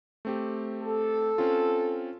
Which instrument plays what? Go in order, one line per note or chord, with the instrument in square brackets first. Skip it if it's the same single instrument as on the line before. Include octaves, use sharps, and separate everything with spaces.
[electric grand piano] A3 C4 G4
[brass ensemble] A4
[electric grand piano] C4 C#4 F4